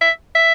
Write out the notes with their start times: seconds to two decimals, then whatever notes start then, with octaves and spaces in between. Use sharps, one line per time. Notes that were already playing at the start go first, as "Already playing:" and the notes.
0.02 E5
0.35 E5